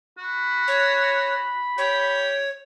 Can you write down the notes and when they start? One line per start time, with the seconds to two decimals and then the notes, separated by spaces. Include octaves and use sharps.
0.18 F#4 B5
0.68 C#5
1.78 G4 C#5